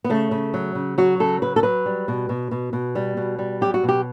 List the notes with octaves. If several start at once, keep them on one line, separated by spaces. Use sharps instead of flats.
B3
C#3 A3
C#3
F#3
C#3
F#3 F#4
C#3 A4
F#3 B4
A4
F#3 B4
G3
B2
B2
B2
B2
G3
B2
G3
F#3 G4
F#4
B2
G4